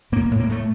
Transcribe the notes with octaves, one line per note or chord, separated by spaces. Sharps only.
A2 A#3
A2
A#3
A2 A3